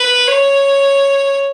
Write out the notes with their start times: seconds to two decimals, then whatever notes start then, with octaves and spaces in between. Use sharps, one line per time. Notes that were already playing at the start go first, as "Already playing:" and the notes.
Already playing: B4
0.27 C#5